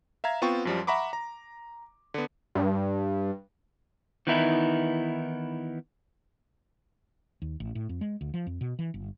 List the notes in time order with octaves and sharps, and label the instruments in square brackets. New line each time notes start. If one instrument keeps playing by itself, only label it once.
[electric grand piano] E5 F5 A#5 G#6
B3 C4 F4 G5 C#6
F#2 F3 G3
E5 F#5 A#5 B5 C#6 D6
A#5
D3 B3
[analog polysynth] G2
[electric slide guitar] D#3 E3 B3 D#4 E4
[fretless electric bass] D#2
A1
A2
F2
G#3
D2
F3
F2
B2
E3
G1